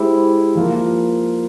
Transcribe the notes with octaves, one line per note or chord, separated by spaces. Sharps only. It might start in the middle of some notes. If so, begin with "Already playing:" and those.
Already playing: G#3 E4 G4 C5
F3 A#3 F4